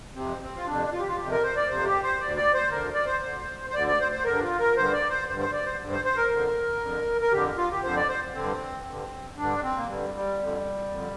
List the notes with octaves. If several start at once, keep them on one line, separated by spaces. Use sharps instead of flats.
F2 C3 C4
C4
F4
F2 C3 D4
F4
G4
F4
F2 C3 G4
A#4
C5
D5
F2 C3 C5
G4
C5
D2 D3 D5
D5
C5
D2 D3 A#4
D5
C5
D2 D3
C5
D2 D3 D5
D5
C5
C5
G2 D3 A#4
D4
F4
A#4
G2 D3 C5
D5
C5
G2 D3 C5
C5
D5
C5
D3
G2
C5
C5
A#4
F2 D3
F2 D3
A#4
F2 D3 G4
F4
G4
F2 D3 C5
D5
C5
G2 D3 C4
G2 D3
G2 D3 D4
C4
A#3
G2 D3 G3
G3
F2 D3
F2 D3